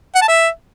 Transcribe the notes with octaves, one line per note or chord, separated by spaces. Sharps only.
F#5
A5
E5